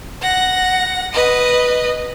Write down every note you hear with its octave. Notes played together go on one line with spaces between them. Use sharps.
F#5 A#6
B4 D#5